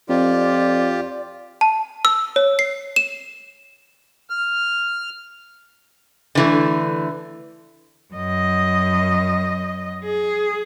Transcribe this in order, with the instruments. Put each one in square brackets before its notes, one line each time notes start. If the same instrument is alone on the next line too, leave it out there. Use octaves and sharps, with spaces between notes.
[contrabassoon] F2 [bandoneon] F4 G4 [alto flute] D5
[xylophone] A5
E6
C#5
C7
E7
[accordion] F6
[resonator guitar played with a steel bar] D3 E3 A3
[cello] F#2 D#5
G#4